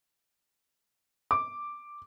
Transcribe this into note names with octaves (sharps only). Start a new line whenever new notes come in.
D6